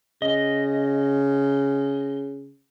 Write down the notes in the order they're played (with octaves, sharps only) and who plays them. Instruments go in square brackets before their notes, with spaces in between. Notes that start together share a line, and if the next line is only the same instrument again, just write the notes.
[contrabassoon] C#3 [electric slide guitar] D#5